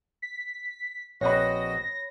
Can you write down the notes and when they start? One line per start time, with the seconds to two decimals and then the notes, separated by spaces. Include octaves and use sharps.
0.22 B6
1.21 A#1 C4 F#4 B4 C#5 D#5 B5 A#6